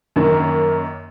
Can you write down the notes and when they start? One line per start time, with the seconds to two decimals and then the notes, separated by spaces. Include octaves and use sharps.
0.16 F#2 D#3 A#3